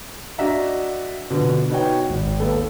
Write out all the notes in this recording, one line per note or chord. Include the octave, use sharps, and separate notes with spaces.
D4 F#4 D#5 E5 F#5 A#5
B2 D3 F3
B3 D#4 F#4 C#5 G5
G#1
D#2 B3 A4